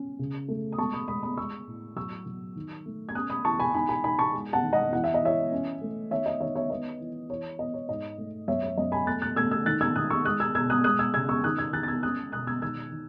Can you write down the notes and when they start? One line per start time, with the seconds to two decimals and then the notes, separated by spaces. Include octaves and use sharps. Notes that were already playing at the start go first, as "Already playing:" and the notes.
Already playing: C#4
0.19 C#3
0.48 A3
0.72 D#6
0.78 G#3 A5 C#6
0.93 B5 D#6
1.08 G#3 B5 D#6
1.23 B5 D#6
1.37 G#3 C#6 E6
1.67 A2
1.96 F#3 C#6 E6
2.26 F#3
2.56 D#3
2.86 A3
3.09 G#6
3.15 C#4 D#6 F#6
3.30 B5 D#6
3.45 E3 A5 C#6
3.59 G#5 B5
3.74 D#4 G#5 B5
3.89 G#5 B5
4.04 D#4 G#5 B5
4.18 A5 C#6
4.33 G#3
4.53 F#5 A5
4.63 D#3
4.73 D#5 F#5
4.92 E3 F#5
5.04 E5
5.14 D#5
5.22 E3 C#5 E5
5.52 C#4
5.81 A3
6.11 D#3 C#5 E5
6.26 D#5
6.40 D#3 C#5 E5
6.56 C#5 E5
6.70 B3 D#5
7.00 E3
7.29 E3 C#5
7.59 B3 D#5
7.74 C#5
7.89 G#2 D#5
8.18 A3
8.48 F#2 C#5 E5
8.63 C#5
8.77 F#2 D#5
8.92 G#5 B5
9.07 A3 F#6 A6
9.22 F#6 A6
9.36 A3 E6 G#6
9.51 E6 G#6
9.66 D#3 F#6 A6
9.81 E6 G#6
9.96 D#3 D#6 F#6
10.10 C#6 E6
10.25 G#3 D#6 F#6
10.40 E6 G#6
10.55 B2 E6 G#6
10.70 D#6 F#6
10.84 G#3 D#6 F#6
10.99 E6 G#6
11.14 C#3 E6 G#6
11.29 C#6 E6
11.44 D#3 D#6 F#6
11.58 E6 G#6
11.73 D#3 F#6 A6
11.83 A6
11.88 E6 G#6
12.03 C#4 D#6 F#6
12.32 B2 D#6 F#6
12.47 E6 G#6
12.62 D#3 E6 G#6
12.91 D#3